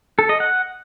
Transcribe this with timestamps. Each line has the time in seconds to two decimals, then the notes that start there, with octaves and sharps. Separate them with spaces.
0.19 A4
0.29 D#5
0.40 F#5